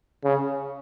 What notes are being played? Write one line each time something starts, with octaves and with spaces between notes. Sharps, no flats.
C#3